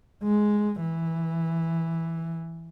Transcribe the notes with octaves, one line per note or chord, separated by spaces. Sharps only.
G#3
E3